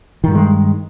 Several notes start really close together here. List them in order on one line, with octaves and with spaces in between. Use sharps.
D#3 G2 F#3 G#3